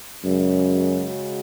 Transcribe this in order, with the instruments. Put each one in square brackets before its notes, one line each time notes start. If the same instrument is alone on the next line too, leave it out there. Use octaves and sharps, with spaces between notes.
[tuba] F#2 [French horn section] C#3 G#3 C#4 F#4